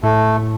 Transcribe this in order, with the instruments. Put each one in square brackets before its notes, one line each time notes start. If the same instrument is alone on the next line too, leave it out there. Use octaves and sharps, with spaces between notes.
[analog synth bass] A2 [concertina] A3